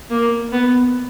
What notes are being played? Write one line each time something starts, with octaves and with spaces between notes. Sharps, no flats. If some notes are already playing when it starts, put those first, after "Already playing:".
A#3
B3